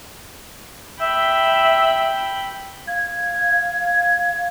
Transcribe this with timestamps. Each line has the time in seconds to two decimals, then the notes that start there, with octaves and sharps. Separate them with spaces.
1.01 E5 G5 B5
2.87 F5 G#6